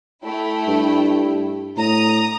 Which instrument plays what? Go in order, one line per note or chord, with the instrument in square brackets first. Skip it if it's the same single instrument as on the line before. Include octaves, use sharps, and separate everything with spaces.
[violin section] A3 E4 G5
[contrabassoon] G2
[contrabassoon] A2 [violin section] A#5 D#6